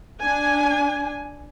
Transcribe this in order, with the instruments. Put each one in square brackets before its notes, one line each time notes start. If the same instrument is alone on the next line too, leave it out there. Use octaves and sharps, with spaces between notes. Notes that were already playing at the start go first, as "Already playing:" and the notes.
[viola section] D4 G#5